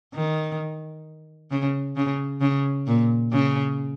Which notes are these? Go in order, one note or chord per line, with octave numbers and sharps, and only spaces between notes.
D#3
C#3
C#3
C#3
A#2
C#3